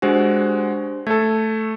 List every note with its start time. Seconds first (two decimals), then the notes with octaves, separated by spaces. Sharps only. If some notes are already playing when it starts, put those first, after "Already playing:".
0.02 G#3 D4 F#4 G4 C5
1.07 A3 A4 G#6